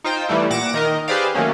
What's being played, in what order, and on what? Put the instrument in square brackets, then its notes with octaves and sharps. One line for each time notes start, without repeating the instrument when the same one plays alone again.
[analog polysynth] D#4 F4 C5 G5
E3 G3 A3 E4
A#2 F#5 D6 A#6 D7 E7
D#3 A#4 D#5
G4 G#4 B4 C5 D5 F5
D#3 F#3 A3 A#3 C#4